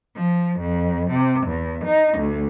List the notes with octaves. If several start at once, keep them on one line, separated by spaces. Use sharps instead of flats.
F3
F2
C3
E2
D#4
D2